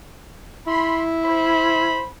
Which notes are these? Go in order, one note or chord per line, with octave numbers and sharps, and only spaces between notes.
E4 B5 C6
C5 B5